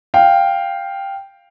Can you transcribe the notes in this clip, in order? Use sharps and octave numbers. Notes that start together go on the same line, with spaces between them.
F5 G5